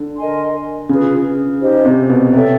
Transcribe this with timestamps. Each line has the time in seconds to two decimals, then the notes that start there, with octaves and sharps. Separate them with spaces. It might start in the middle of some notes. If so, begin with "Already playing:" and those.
Already playing: D3
0.16 A#4 D#5 G#5 C6
0.89 C#3 F4 G#4 B4
1.61 D#4 G4 C5 D#5
1.85 C3
2.10 B2
2.33 C3 A4 C#5 E5 G5